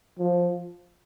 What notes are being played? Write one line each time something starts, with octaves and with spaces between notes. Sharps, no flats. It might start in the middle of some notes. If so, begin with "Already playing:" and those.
F3